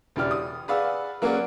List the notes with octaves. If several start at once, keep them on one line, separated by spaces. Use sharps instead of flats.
E1 C#3 E4 G4 D5 F6
D#6
G#4 B4 D5 F5 F#5 E6
F#3 A#3 C#4 G#4 D5 F#5